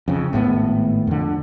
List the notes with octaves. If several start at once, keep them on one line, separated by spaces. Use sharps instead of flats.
F2 C#3
G#1 A2 D3 B3
F2 D3